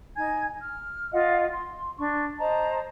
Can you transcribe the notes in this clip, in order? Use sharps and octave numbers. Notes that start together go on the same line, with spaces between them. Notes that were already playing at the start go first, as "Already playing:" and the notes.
D#4 G#5 G#6
F6
F4 D#5 F5 F#5
C6
D4 C#6
C5 D#5 A5 A#5